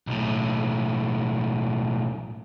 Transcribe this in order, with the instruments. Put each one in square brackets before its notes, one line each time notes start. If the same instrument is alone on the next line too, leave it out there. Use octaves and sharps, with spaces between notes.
[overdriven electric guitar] B1 A2